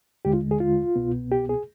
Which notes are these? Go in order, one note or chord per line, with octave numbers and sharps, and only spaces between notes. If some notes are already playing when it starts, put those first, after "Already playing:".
D#2 D3 G#3 G4
F4
G#4
F4
C2 B2 B3
G4
G#4